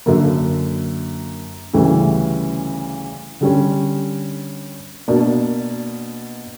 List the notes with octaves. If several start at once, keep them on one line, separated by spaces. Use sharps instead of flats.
F#2 D3 A#3
D2 C#3 E3 G3 C#4
D3 G3 C#4
B2 A#3 D4